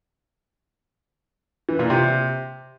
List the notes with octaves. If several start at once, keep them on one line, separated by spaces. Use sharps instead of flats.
E3
A#2
C3